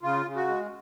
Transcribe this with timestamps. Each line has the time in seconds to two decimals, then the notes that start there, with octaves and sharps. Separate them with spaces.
0.03 C#3 F4
0.26 C#3
0.36 F#4
0.48 G#3